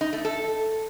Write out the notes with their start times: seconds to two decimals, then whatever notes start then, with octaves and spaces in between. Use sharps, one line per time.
0.01 D#4
0.13 A3
0.25 A4